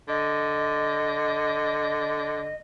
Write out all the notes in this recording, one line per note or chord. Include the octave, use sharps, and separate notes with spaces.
D3 D#5